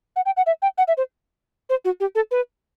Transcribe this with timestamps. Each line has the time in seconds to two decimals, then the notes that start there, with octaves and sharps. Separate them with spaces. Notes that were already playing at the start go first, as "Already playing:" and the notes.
0.16 F#5
0.26 G5
0.37 F#5
0.46 E5
0.62 G5
0.78 F#5
0.88 E5
0.97 C5
1.70 C5
1.85 F#4
2.00 G4
2.15 A4
2.31 B4